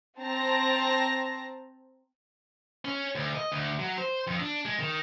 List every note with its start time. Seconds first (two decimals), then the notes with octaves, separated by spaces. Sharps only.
0.19 C4 A5 A#5 A#6
2.85 C#4
3.15 D2
3.35 D#5
3.52 D2
3.79 F#3
3.98 C5
4.27 F2
4.40 D4
4.66 G#3
4.80 D#3